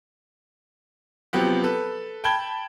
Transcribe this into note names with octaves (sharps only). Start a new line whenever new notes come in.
C3 F3 F#3 B3 G4
A4 B4
G5 A5 B5 G#6 G7